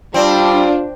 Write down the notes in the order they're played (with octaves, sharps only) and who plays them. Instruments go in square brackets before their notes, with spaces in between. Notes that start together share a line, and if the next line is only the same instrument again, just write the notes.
[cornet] G3 [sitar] C4 [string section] D4 [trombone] F4